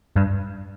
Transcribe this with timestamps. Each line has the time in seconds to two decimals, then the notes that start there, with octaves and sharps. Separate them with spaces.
0.16 G2